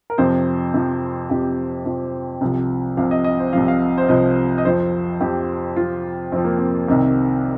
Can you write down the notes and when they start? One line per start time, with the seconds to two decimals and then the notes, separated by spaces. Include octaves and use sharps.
0.10 A#4
0.18 F2 C3 F3 C5
0.74 F2 C3 F3
1.29 F2 C3 F3 G4
1.86 F2 C3 F3
2.41 C2 C3 F3
2.97 C2 C3 F3 F5
3.11 D#5
3.24 D#5
3.39 C5
3.53 C2 C3 F3 F5
3.68 F5
3.98 C5
4.08 C2 C3 F3 D#5
4.58 D#5
4.65 F2 F3 C5
5.20 F2 F3 G4
5.76 F2 F3 F4
6.32 F2 F3 C4
6.45 A#3
6.58 C4
6.88 C2 C3 D#3